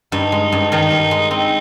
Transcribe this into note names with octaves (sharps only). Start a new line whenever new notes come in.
G2 D#4
G#3
G2
D#3 D#4
G2
G#3
C4 D#4